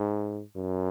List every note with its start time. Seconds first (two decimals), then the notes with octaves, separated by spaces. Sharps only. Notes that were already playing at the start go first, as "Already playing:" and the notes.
Already playing: G#2
0.57 F#2